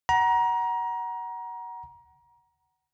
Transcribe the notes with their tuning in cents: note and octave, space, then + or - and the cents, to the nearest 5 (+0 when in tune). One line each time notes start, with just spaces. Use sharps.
F#5 +20 A#5 +25